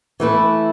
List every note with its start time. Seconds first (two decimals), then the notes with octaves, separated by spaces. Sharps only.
0.20 E3 A3 E4 B4